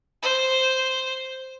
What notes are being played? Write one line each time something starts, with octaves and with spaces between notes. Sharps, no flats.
C5